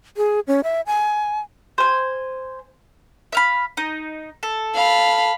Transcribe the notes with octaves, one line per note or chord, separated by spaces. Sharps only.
G#4
C#4
E5
G#5
C5 G#5
E5 F5 B5
D#4
A4
F5 B5